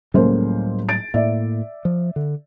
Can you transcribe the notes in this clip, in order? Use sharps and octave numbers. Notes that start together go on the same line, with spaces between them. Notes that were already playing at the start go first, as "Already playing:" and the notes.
C#2 A2 F#3 G3 A#3 C5
A6 D7
A2 A#3 D5 E5
F3
D3